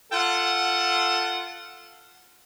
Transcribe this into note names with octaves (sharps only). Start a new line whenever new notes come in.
F4 A4 F#5